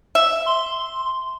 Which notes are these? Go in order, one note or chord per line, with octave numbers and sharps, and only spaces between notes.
E5
C6